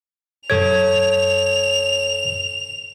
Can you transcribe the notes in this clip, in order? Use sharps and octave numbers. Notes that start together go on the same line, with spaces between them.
F#2 A4 C#5 G#6 F7